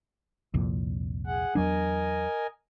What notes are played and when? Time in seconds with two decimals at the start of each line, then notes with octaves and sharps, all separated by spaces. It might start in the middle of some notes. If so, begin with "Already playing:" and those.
0.54 C2 F2 A#2
1.27 G#4 F#5
1.55 E2 F#3 D4 A#4 D#5 G#5